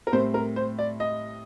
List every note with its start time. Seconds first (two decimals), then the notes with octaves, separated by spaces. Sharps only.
0.07 A#4
0.12 A2 G3 C4 C5
0.34 A#4
0.56 C5
0.79 D5
1.00 D#5